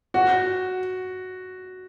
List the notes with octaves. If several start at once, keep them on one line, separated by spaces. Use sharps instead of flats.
F#4